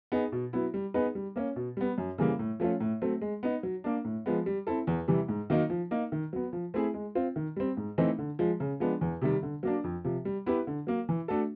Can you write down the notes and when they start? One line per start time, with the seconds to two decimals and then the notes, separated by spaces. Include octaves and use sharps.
0.12 B3 D#4 G#4
0.32 B2
0.53 F#3 B3 E4
0.74 G3
0.94 B3 D#4 G#4 B4
1.15 G3
1.36 A#3 C#4
1.56 B2
1.77 G3 B3
1.98 F#2
2.18 C#3 E3 G3 A#3
2.39 A2
2.60 F3 A3 C#4 F4
2.80 A2
3.02 F#3 A3 C4
3.21 G#3
3.43 B3 D#4
3.63 F#3
3.84 A#3 D4
4.04 A2
4.26 F3 G#3 B3
4.46 G3
4.67 C4 E4 A4
4.87 E2
5.08 C3 E3 G3
5.28 G#2
5.50 D#3 F#3 A#3 D#4
5.70 F3
5.91 A#3 D#4
6.12 D#3
6.33 F#3 B3
6.53 F3
6.74 A3 C4 E4 G#4
6.94 G#3
7.15 C4 F4
7.36 D#3
7.56 G3 C4
7.77 G#2
7.98 E3 A3 C4 D#4
8.19 D3
8.39 F3 G#3
8.60 C#3
8.80 F3 G#3 B3 D4
9.01 E2
9.21 C3 D#3 G3
9.43 D3
9.63 F#3 A#3 D4
9.84 F2
10.05 C3 F3
10.25 G3
10.46 B3 E4 G4 B4
10.67 D3
10.87 F#3 A#3
11.09 E3
11.28 A3 D4 F#4 A4